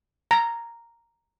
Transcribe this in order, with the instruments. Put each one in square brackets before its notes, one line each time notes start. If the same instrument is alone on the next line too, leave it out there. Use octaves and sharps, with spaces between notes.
[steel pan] A#5